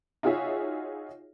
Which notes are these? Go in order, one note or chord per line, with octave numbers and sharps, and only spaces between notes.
D#4 F4 F#4 G#4 C#5 E5